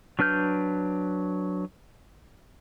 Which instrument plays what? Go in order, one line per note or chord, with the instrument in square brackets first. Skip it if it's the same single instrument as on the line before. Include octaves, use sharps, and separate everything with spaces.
[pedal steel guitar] F#3 D4 B4 F6 G6